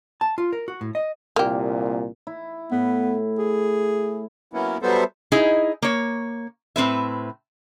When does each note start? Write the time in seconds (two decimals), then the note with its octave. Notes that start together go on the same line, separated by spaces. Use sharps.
0.21 A5
0.38 F4
0.53 A#4
0.68 F#4
0.81 A2
0.95 D#5
1.36 C2 A#2 A#3 G4
2.27 E4
2.72 A2 B3
3.39 G#4
4.53 F#3 A#3 B3 C#4 E4
4.82 F#3 G3 B3 A4 C5 E5
5.32 D#4 E4 G#4 D#5
5.82 A#3 C#5
6.76 A2 C4 B4 E5